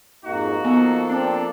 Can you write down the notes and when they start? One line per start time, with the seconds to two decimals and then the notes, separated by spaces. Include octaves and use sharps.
0.24 F2 G#2 A#3 D#4 F#4
0.65 F3 A#3 B3 A4
1.09 C4 D4